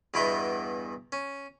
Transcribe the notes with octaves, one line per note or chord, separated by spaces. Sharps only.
E2 G2 B2 E3 E4 G5
C#4